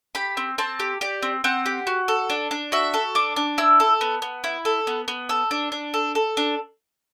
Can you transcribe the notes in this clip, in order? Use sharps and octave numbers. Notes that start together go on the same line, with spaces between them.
G4 B5
C4
C4 A5
G4
G4 D5
C4
C4 F#5
G4
F#4
A4
D4
D4
F#4 E5
A4
D4 D6
D4
E4 E6
A4
B3
B3
E4
A4
B3
B3
A4 E6
D4
D4
A4
A4
D4